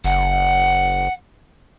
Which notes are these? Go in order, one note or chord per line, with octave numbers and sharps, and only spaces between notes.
F#1 F#5